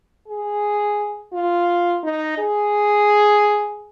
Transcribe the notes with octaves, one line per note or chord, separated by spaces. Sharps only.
G#4
F4
D#4
G#4